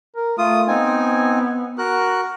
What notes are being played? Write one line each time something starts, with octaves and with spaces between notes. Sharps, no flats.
A#4
A3 F4 D#6
B3 C4 D#4 G#5
F#4 A#4 F#6